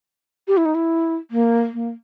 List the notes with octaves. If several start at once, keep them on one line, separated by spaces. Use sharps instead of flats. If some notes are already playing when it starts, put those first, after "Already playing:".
G4
E4
D#4
E4
A#3
A#3